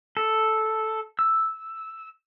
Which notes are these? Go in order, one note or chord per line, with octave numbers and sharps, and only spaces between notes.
A4
E6